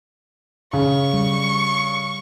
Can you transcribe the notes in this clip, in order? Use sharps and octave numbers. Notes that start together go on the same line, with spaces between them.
C#3 C#6
G3